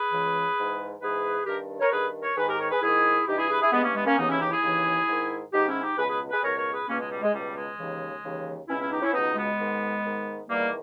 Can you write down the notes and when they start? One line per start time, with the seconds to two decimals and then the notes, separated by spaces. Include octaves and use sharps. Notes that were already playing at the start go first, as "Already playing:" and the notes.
Already playing: G#4 B4
0.11 C#2 C#3 E3
0.57 G#2 E3
1.01 G#2 E3 G#4 B4
1.46 G2 D#3 G4 A#4
1.81 A#4 C#5
1.91 G2 D#3 G#4 B4
2.22 A#4 C#5
2.37 G#2 D#3 G#4 B4
2.48 G4 A#4
2.60 A#4 C#5
2.71 G#4 B4
2.82 G#2 D#3 E4 G#4
3.27 G2 E3 D#4 G4
3.38 E4 G#4
3.50 G#4 B4
3.61 E4 G#4
3.72 G2 E3 G#3 B3
3.84 A#3 C#4
3.95 G#3 B3
4.06 A#3 C#4
4.17 D#2 C#3 E3 B3 D#4
4.28 C#4 E4
4.40 D#4 G4
4.51 E4 G#4
4.62 D#2 C#3 E3
5.07 G#2 D#3
5.52 G#2 D#3 D#4 G4
5.68 C#4 E4
5.83 D#4 G4
5.97 C#2 G#4 B4
6.02 B2
6.09 G#4 B4
6.31 G#4 B4
6.43 C#2 B2 A#4 C#5
6.57 A#4 C#5
6.72 G#4 B4
6.88 C#2 B2 A#3 C#4
7.00 G#3
7.11 G3
7.22 G#3
7.33 C#2 B2 G3
7.56 G#3
7.78 D#2 C#3 E3
8.23 D#2 C#3 E3
8.68 B2 C#4 E4
8.71 C#2
8.79 C#4 E4
8.91 D#4 G4
9.02 C#4 E4
9.13 C#2 B2 B3 D#4
9.36 G#3 B3
9.59 G#2 D#3
10.04 G#2 D#3
10.49 E2 D#3 G3 A#3